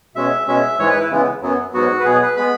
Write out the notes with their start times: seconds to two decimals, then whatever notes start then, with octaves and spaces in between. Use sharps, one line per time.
0.15 B2 G#3 C#4 E5
0.47 B2 G#3 C#4 E5
0.79 G#2 E3 G#3 C#5
0.89 B4
1.00 E4
1.11 C#3 E3 G#3 B3
1.42 F#2 F#3 B3
1.74 G#2 F#3 B3 F#4
2.00 B4
2.05 B2 F#3 B3 G#4
2.22 B4
2.37 G#3 B3 B5